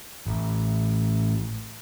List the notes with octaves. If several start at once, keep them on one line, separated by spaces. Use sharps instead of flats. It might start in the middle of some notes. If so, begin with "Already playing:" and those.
A1